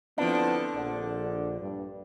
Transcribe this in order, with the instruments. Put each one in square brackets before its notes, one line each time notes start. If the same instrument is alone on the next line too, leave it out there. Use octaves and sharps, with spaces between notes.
[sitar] D3 F3 [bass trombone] B3 [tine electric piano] C4 E4 F4 [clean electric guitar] D4
[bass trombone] A#1 [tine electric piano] A4 D5 F#5
[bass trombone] G2